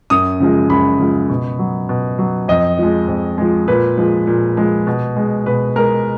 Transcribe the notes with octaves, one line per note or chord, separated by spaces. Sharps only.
F#2 D#6
C#3 F3 G#3
F#2 B5
C#3 F3 G#3
B2
F#3
B2
F#3
F2 D#5
F3 G#3
F2
F3 G#3
A#2 B4
F3 G#3
A#2
F3 G#3
B2
G#3
B2 B4
G#3 A#4